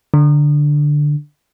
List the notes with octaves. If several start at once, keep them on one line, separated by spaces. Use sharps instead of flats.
D3